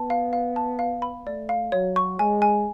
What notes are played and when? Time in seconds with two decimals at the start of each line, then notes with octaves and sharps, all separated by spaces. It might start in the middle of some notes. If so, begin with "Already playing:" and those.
Already playing: B3 A5
0.10 F5
0.33 F5
0.56 A5
0.79 F5
1.02 B5
1.26 A3 D5
1.49 F5
1.72 F#3 C#5
1.96 C#6
2.19 G#3 G#5
2.42 G#5